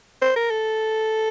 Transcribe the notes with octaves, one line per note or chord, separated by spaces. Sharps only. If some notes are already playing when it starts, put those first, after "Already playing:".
C5
A#4
A4